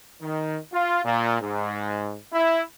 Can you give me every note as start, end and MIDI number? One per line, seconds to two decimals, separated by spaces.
0.22 0.57 51
0.73 1.03 65
1.05 1.37 46
1.41 2.16 44
2.32 2.60 64